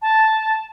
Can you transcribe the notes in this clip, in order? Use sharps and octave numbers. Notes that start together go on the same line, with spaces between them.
A5